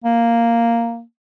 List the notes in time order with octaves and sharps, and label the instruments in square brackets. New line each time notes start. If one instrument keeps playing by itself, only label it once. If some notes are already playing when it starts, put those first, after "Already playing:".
[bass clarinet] A#3